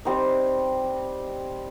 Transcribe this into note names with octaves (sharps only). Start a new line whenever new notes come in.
G3 C4 D#4